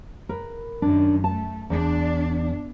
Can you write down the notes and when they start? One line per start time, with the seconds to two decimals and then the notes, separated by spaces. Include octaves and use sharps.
0.29 A#4 B4
0.82 F#2 D#3 D4
1.24 A3 A5
1.70 E2 D4